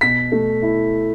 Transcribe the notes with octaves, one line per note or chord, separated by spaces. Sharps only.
B2 B6
A3
E4